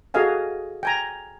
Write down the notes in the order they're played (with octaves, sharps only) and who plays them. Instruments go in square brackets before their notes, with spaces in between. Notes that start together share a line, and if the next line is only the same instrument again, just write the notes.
[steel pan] F#4 G#4 A4 D#5 F5 G#5
G5 G#5 A#5